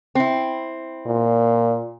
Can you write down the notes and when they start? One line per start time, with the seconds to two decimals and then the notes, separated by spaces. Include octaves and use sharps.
0.15 C4 E4
1.06 A#2